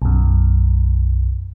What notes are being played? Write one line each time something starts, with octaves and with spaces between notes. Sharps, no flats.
B1 F#2